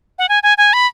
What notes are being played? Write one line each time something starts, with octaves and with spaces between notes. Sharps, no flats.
F#5
G#5
G#5
G#5
B5